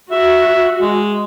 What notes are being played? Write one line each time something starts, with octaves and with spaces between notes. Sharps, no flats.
F#4 E5
G#3